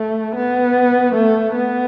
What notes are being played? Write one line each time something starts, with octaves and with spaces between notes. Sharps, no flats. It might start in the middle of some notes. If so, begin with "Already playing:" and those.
Already playing: A3
B3
A3
B3